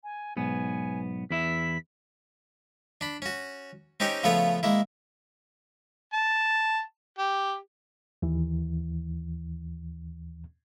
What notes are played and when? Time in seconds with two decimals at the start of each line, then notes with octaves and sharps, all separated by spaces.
0.04 G#5
0.37 B1 G#2 B3 G#5
1.30 E2 E4 E5 B6
3.01 D4 B5
3.22 C#4 F#4
4.00 C4 C#4 D#4 G4 C#5
4.23 C#3 F3 A3 B3 F4 C#5
4.63 G#3 A#3 E4
6.13 A5
7.18 G4
8.22 D#2 E3